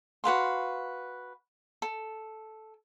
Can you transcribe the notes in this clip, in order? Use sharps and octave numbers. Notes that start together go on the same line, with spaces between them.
F#4 B4 F5 C6
A4